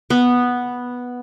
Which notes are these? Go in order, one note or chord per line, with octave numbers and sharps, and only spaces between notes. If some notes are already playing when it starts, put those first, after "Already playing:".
B3